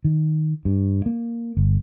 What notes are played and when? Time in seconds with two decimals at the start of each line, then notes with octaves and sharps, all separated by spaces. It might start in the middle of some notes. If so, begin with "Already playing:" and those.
0.04 D#3
0.65 G2
1.06 A#3
1.57 G1